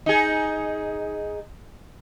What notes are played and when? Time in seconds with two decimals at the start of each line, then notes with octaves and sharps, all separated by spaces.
0.06 D#4 G#4